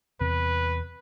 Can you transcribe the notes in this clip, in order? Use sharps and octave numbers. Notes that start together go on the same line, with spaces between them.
E2 C3 C4 B4